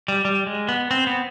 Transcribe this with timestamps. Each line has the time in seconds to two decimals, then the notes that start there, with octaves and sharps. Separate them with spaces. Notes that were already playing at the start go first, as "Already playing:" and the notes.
0.08 G3
0.25 G3
0.47 G#3
0.69 B3
0.91 C4
1.07 B3